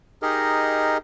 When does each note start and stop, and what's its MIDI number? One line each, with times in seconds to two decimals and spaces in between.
0.22 0.98 63
0.22 0.98 67
0.22 0.98 68
0.22 0.98 70
0.22 0.98 75